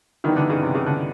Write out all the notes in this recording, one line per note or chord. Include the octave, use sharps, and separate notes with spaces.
D#3 E3 G3 B3 D#4
D3
C#3
C3
C#3
D3